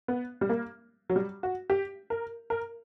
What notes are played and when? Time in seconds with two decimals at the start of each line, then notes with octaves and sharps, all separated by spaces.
0.08 B3
0.41 G3
0.49 A#3
1.09 F#3
1.16 G3
1.43 F#4
1.70 G4
2.10 A#4
2.50 A#4